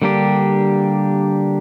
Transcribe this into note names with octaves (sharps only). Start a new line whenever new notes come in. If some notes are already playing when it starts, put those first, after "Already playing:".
D3 G3 A#3 D4 G4